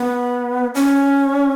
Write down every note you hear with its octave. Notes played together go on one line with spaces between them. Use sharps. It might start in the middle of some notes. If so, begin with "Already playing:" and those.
Already playing: B3
C#4